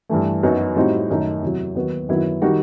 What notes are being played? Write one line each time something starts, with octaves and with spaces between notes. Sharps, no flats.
G2 E3 A3
F#2 F#3 B3 D#4 F#4
A2 G3 C4 D#4 F#4
F#2 D#3 A3 D#4
E2 C3 F#3
D#2 D#3 F#3 B3 F#4
F#2 D#3 F#3 B3 E4
D#3 G3 D#4 F#4